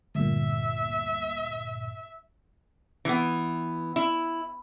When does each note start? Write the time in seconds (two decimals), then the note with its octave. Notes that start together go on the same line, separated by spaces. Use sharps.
0.15 D2 G2 A#2 E5
3.05 E3 B3
3.96 E4